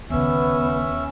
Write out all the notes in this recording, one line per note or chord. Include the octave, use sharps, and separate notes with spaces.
D#2 C#3 B3 C#4 E5